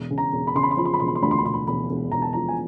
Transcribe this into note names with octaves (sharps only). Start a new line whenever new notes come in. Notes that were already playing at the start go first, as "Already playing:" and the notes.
Already playing: E1
C#3
A#5
E1
B5
C#3 C6
B5
C6
F3 B5
C6
B5
E1 C6
B5
C6
D2 B5
C6
B5
E1 C6
B5
E1 B5
E1
E1 A#5
A5
F3 A#5
G#5